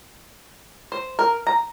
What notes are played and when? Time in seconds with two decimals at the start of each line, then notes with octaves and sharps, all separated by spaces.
0.92 C5
1.19 A#4
1.47 A#5